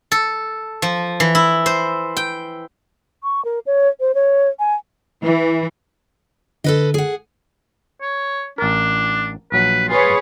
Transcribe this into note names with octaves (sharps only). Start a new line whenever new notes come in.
A4
F3
E3
E4
C5
G5
C#6
A#4
C#5
C5
C#5
G#5
E3
D3 A4 B4 D#5
G#4 F#5
C#5
A1 D4 A#4
A#1 F#3 B4
F4 G#4 B4 C#5